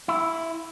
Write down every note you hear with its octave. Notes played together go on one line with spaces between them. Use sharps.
E4